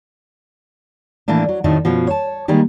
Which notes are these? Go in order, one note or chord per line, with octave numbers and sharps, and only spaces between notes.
A2 E3 A3 A#3 D4
F#3
F2 A2 D#3 F#3 A3 D4
F#2 B2 F3
C#5 A5
D#3 G3 G#3 A#3 D#4